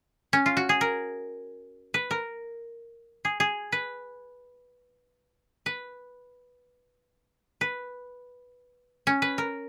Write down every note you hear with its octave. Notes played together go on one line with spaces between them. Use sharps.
C#4
F4
F#4
G#4
A#4
B4
A#4
G#4
G#4
B4
B4
B4
C#4
B4
A#4